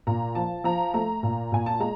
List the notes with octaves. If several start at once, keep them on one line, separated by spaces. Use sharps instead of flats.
A#2 A#5
F3 A5
F3 A#5
A3 A#5
A#2
A#2 G#5
A5
G#3 A#5